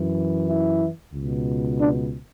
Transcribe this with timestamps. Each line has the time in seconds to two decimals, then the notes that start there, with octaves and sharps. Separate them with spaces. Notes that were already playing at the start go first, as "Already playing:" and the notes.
Already playing: F#2 E3
0.49 E4
1.14 C#2 B2
1.79 D4